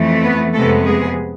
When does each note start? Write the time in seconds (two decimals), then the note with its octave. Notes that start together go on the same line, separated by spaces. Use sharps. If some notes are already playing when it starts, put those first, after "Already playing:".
Already playing: F2 E3 A3
0.23 B3 B4
0.54 F2 C3 G#3 A3 B3 A4
0.85 G#3 G#4